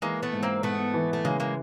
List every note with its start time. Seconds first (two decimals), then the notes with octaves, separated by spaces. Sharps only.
0.02 E3 G#3 A#3
0.23 A3 B3
0.33 G#2
0.43 A#3 C4
0.63 G#2 A3 B3
0.94 E3
1.13 A3
1.25 C#3 G#3 A#3
1.40 G#3 A#3